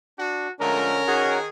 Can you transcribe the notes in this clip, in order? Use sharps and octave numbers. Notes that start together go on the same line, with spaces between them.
D4 F#4
D3 F3 G#3 A3 C#4 A#4
D#3 F#4 G#4 C#5 F#5